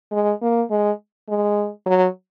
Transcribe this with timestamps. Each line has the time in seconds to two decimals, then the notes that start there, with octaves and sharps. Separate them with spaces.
0.12 G#3
0.42 A#3
0.71 G#3
1.29 G#3
1.86 F#3